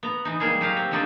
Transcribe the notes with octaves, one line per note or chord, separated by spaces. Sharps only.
B3 A#5
E3 D#4
G3 G#3 A#3 G#4
F#3 G4 F5 A#5
C4
D3 F3 C4 D#4 D5